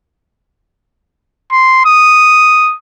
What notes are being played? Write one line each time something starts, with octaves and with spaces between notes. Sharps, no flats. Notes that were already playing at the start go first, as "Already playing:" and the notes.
C6
D#6